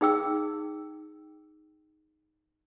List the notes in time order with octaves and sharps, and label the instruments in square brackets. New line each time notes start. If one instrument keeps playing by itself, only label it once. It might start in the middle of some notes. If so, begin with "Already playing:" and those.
[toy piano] D#4 G#4 G5 E6